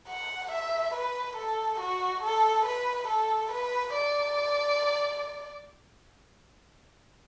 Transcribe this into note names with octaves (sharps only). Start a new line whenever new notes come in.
F#5
E5
B4
A4
F#4
A4
B4
A4
B4
D5